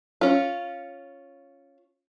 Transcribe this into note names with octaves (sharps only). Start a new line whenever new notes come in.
C#4 F4